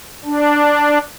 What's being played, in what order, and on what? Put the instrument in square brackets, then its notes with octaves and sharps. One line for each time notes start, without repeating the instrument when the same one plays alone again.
[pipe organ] D4